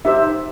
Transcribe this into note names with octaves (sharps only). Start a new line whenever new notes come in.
D#4 G4 C5 E5